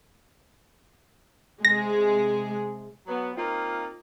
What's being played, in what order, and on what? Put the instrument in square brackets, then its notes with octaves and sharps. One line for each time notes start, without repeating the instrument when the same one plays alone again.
[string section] C3 G#3 G#4 [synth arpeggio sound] A#6
[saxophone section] F#3 B3
A#3 C4 D#4 F4